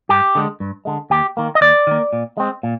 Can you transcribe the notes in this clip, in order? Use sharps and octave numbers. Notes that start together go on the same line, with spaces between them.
G2 G4
D3 G#3
G2
D3 G#3
D#2 G4
D#3 A#3
D#5
D#2 D5
D#3 A#3
A#2
G#3 C4
A#2